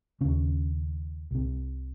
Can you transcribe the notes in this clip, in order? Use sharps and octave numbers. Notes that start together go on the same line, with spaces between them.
D#2 C#3 C#4
C2 C3